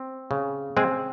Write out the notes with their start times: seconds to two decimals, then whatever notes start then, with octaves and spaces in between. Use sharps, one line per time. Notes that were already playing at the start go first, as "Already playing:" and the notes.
Already playing: C4
0.31 C#3
0.77 G#3 C4 G#4